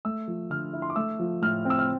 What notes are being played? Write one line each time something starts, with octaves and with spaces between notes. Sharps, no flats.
A3 E6
F3
D3 F6
E4
C6
D6
A3 E6
F3
A2 F6
C4
E6
F6